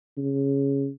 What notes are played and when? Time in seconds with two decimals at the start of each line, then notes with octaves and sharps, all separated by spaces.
0.17 C#3